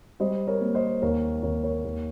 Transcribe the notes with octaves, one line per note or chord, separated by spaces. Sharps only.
G3 C5 D#5
A#4 C#5
A#3
C5 D#5
D#2 A#4 C#5
D#2 A#4 C#5
A#4 C#5
D#2